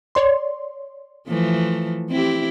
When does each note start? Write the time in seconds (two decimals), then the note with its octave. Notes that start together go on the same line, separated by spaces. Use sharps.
0.15 C#5 D5 C6
1.28 E3 F3 A3
2.10 C4 E4 G4